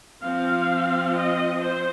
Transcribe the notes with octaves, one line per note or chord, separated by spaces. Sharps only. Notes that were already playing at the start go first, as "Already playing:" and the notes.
F3 C4 F5
D#5
C5